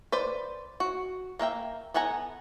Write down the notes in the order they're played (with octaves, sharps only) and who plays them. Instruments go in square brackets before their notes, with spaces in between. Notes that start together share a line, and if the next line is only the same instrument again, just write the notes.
[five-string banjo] B4 C5 D5
F#4
A#3 A#4 E5 G5
B3 A4 F#5 G#5 A#5